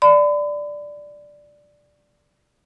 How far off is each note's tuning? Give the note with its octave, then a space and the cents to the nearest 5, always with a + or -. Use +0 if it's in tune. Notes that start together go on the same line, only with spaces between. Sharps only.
D5 +0 B5 +40